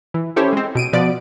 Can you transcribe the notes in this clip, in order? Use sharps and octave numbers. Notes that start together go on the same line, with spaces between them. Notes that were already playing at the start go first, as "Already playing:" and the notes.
E3
C#4 E4 G4 A4 C5 C#5
G#3 C4
B2 D7 D#7
B2 F3 B3 D5 D7